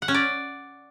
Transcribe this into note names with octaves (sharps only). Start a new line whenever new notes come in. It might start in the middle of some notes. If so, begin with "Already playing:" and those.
F#5
C#4
D5